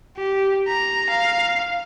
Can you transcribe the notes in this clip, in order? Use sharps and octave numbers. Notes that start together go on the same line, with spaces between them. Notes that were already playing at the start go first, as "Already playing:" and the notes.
G4
A#5
F5